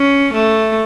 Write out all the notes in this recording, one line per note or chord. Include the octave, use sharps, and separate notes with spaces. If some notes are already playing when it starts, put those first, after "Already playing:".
Already playing: C#4
A3